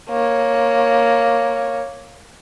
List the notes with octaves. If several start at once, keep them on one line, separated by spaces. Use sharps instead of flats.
A#3 C#5